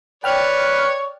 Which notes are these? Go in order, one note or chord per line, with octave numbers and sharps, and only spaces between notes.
B4 C#5 D5 G5 F6 F#6